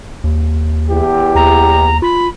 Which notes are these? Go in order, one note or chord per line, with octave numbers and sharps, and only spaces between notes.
D#2
E2 G4
D#2 A#5
F4 B5